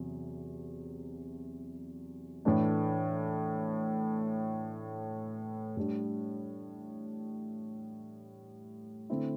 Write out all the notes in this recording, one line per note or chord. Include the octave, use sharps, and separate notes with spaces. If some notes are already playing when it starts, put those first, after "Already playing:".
Already playing: E2 C3 F#3
A2 E3 A3 D4
A2 G3 D4
D3 A3 C4 E4